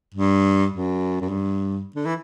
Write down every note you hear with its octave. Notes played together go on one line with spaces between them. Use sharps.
G2
F#2
F#2
G2
D3
E3